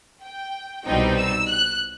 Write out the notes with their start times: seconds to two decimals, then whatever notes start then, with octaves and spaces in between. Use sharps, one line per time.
0.23 G5
0.85 C2 B2 G3 C4 D#4 G5
1.17 E6
1.49 F#6